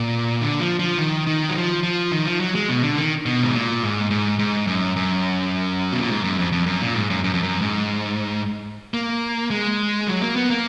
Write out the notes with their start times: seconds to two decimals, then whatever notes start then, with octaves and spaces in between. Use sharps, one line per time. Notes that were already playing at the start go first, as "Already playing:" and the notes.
Already playing: A#2
0.41 D3
0.60 F3
0.79 F3
0.98 D#3
1.27 D#3
1.49 F#3
1.56 F3
1.83 F3
2.12 D#3
2.26 F3
2.40 F#3
2.55 G#3
2.69 B2
2.84 D3
2.98 D#3
3.26 B2
3.43 G#2
3.54 A#2
3.82 G#2
4.11 G#2
4.39 G#2
4.67 F#2
4.96 F#2
5.92 B2
6.01 A#2
6.09 G#2
6.24 F#2
6.38 F2
6.52 F2
6.66 F#2
6.81 A#2
6.94 G#2
7.10 F#2
7.24 F#2
7.34 F2
7.43 F#2
7.61 G#2
8.94 A#3
9.50 G#3
10.08 F#3
10.22 A#3
10.36 B3
10.50 A#3